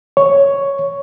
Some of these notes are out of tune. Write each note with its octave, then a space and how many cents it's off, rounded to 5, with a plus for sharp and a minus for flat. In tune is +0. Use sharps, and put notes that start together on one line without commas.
C#5 +5